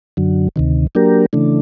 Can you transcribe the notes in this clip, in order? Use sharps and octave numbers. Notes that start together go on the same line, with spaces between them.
F#2 D3 F#3
D2 C3 D#3
F#3 A#3 D4 G4 A#4
C#3 E3 A3 D4